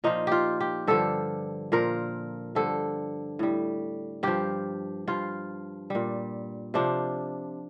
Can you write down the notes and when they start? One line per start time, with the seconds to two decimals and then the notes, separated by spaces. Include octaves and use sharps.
0.04 A#2 F3 D#4
0.27 F4 G4
0.60 G4
0.87 G2 D3 F3 A4
1.72 A#2 F3 A#4
2.55 G2 D3 F3 A4
3.39 A2 G3
4.23 G2 F3 G4
5.07 G2 F3 F4
5.90 A#2 G3
6.74 C3 F3 D4